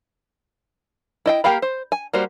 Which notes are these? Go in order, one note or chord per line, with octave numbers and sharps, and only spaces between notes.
E4 D#5 G5
A#3 G4 A#4 F5 B5
C5
G#5
G3 A#3 F#4 C5